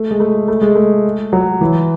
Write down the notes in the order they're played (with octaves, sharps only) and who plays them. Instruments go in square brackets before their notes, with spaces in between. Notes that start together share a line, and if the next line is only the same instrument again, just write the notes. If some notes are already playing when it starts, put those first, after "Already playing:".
Already playing: [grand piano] A3
G#3
A3
A3
G#3
A3
F#3
E3